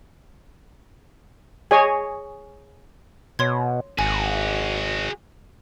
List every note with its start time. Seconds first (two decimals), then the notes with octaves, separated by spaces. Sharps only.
1.71 G#4 C#5 D#5 G#5
3.39 B2 C#5 C6 G#6
3.99 G#1 F#4 G#4 G#5